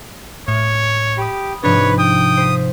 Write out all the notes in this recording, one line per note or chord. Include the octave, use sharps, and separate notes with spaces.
A2 C#5
G4 B5 D#6
G#2 C3 F3 D4 B4 C#5
G5 D#6
C5 B6